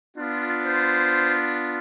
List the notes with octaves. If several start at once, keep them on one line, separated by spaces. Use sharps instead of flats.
B3 D4 F4
C5